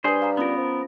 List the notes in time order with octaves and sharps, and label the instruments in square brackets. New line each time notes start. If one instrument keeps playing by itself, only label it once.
[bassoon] G3 [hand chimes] D4 B4 [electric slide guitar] G#4 C5
[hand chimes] F5 A#5
[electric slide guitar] B3 A#4 [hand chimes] C#4 F4
[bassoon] F3